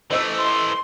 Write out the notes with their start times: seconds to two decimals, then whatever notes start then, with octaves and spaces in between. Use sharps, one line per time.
0.11 E3 A3 C5 D#5 E6
0.39 C6